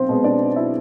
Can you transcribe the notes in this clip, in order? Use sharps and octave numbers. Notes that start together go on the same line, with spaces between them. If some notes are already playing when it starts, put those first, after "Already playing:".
Already playing: B1 C4 C5
B2 G#3 B3
D4 D5
E4 E5